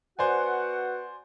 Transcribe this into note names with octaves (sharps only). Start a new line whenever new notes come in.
B3 F#4 C5 D5 F#5 G#5